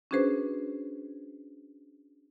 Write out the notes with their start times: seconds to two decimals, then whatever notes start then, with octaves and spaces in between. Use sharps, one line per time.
0.11 C#4 D4 F#4 G#4 B4 C5